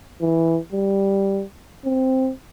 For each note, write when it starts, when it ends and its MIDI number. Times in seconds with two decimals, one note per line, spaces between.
0.21 0.59 52
0.72 1.43 55
1.85 2.31 60